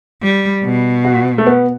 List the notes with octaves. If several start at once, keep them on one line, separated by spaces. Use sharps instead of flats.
G3
B2
F#4
A3
B3